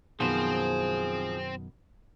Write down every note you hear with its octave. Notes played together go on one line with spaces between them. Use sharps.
F#2 B2 D#3 F3 C4 G#4 C5